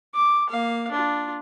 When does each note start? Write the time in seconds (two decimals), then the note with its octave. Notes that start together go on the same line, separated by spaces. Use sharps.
0.14 D6
0.49 A#3 F5
0.91 D4 F4